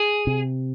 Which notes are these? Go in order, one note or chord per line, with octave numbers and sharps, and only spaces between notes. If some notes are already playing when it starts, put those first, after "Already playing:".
Already playing: G#4
C3